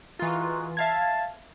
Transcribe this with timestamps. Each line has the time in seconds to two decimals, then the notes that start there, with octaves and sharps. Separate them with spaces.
0.19 E3 G#3 F4 F#4 A#4
0.77 E5 F5 A5 G#6